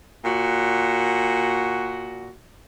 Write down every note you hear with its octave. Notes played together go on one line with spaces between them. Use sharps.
A#2 F#4